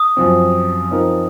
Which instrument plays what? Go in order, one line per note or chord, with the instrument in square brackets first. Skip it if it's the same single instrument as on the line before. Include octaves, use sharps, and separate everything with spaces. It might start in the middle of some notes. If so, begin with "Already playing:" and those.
Already playing: [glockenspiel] D#6
[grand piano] F#2 F3 C4
F3 C4 D#4 A#4